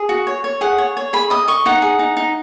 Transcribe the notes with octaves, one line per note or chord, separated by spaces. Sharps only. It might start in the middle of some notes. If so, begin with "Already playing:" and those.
Already playing: G#4
F#4
C#5
C#5
G#4 F#5
C#5
C#5
G#4 B5
D#5 D#6
D#5 C#6
D#4 F#5
G#4
D#4
D#4